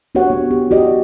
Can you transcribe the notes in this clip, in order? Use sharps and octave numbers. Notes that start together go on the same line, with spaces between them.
D4 F#4 G4 C#5 F#5
B3
G4
F#4 G4 D5 D#5